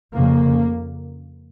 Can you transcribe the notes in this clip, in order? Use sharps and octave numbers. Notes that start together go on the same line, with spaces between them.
F2 C#3 A#3